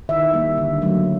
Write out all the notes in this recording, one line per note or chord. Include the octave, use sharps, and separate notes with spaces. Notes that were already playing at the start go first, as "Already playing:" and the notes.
D#3 E5
G3 A#3
D3
F#3 A3